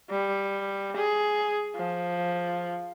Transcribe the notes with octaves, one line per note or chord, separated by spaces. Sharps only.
G3
G#4
F3